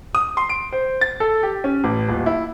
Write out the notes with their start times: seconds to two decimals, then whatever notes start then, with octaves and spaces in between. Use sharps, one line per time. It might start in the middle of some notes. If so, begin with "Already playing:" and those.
0.15 D#6
0.37 C6
0.49 D7
0.73 C5
1.01 A6
1.20 A4
1.43 G4
1.64 C#4
1.84 A1
2.09 D#1
2.26 E4